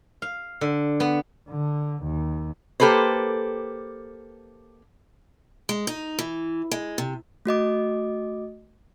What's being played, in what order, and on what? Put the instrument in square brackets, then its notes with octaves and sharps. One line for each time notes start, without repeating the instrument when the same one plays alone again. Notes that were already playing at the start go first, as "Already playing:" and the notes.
[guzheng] F5
D3
B3
[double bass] D3
D#2
[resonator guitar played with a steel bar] A#3 G4 A4 B4 C5
[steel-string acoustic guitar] G#3
D#4
E3
G#3
C3
[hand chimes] A3 F#4 D#5 D6